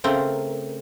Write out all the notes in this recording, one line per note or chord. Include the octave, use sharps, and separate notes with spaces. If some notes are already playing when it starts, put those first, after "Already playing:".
C#3 A3 C4 A#4